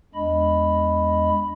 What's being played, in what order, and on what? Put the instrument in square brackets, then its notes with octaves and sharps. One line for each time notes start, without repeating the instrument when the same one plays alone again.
[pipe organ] E2 G#3 D4 D#5 B5